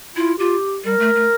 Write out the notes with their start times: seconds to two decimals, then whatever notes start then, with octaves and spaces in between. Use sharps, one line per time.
0.16 E4 F4
0.38 F4 G4
0.84 G3 A#4
0.99 A3
1.16 A3